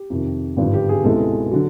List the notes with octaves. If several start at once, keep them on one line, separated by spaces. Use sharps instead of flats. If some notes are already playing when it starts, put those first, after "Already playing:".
Already playing: G4
F2 C3 D#3
G#1 G2 D3 F3
G4
G#4
C#2 B2 G#3 C4 E4 A4
D3 F#3